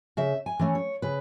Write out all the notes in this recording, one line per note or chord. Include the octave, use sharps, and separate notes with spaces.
C#3 E5
G#5
E3 A3 C#4
C#5
C#3 B4